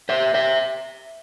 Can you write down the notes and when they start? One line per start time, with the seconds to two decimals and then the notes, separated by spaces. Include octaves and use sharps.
0.09 C5 E5
0.34 C5 E5